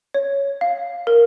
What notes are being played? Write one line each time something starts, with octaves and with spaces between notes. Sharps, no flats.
C#5
F5
A#4